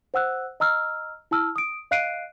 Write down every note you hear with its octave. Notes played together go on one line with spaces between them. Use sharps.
C5 F#5 E6 F#6
D#5 A#5 E6 F6
E4 A5 E6 F6
D#6 D7
D#5 F5 F#6 C7 D7 D#7